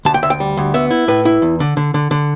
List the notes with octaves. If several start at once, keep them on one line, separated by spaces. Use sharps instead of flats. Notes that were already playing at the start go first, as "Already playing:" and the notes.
D2 A5
G5
D2 E5
G5
G3
D2
B3 E5
E4
A2 B4
E4
E2
D3
D3
D3
D3